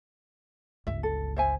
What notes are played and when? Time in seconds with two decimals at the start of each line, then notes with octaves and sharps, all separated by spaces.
0.87 G1 C#2 E5
1.03 A4
1.36 C5 E5 G#5